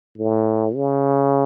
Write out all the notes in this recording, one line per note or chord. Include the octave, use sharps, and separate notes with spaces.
A2
C#3